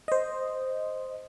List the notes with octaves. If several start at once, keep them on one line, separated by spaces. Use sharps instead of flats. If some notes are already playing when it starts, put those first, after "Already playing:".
C5 D#5